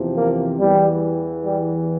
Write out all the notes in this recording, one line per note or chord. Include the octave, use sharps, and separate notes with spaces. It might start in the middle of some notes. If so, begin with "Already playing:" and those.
Already playing: E2 C3 F3
A#3
E2 E3 G3
G3